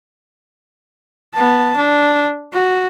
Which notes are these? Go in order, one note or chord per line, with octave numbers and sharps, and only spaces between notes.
B3 A5
D4
F#4